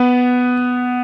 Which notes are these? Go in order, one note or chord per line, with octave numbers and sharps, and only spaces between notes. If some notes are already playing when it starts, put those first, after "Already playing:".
Already playing: B3